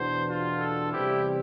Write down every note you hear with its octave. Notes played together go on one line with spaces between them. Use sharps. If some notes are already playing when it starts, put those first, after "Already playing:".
Already playing: E2 B2 B3 D4 C5
F4
A4
E2 C3 G3 C4 E4 G4